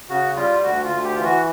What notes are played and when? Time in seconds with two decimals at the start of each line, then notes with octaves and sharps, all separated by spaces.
0.09 C#3 F#4
0.36 G3 F4
0.63 D2 F#4
0.84 F4
0.90 D2
1.04 G4
1.15 E3 F4
1.24 F#4